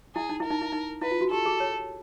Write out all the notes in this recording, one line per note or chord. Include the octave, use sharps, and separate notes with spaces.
E4 G#4
D#4
E4 A#4
D#4
E4
D#4
E4 B4
F4
F#4
G4 A4
G#4
C#5